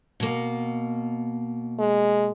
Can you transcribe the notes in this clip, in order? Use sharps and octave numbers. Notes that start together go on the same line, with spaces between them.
B2 A#3
G#3